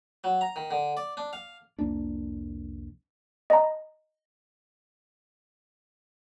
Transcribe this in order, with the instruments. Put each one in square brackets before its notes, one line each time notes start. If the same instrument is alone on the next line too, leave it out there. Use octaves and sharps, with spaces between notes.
[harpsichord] F#3
A#5
D#3
D3
D5
D4
F5
[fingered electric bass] C2 F2 A#3 D4
[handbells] D#5 A#5